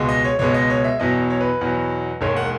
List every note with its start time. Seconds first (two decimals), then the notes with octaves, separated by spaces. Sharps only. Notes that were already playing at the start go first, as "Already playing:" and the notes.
Already playing: C#2 B2 G#3
0.09 D#5
0.24 C#5
0.39 C#2 B2 G#3 C#5
0.54 D#5
0.70 C#5
0.84 E5
1.00 E2 B2 F#3 D#5
1.30 C#5
1.41 B4
1.61 E2 B2 F#3
2.21 E1 D#2 D#3 G#3 C#5
2.37 F#5